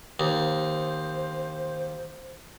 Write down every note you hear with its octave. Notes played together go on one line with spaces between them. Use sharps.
D#2 C5